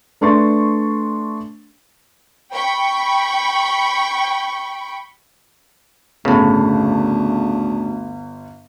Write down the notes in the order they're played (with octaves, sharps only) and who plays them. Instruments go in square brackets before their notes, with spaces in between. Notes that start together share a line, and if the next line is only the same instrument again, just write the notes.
[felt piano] A3 D4 B4 C6 C#6 A6
[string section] G5 B5 C#6
[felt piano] G1 [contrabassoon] D2 [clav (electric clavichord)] A2 C#3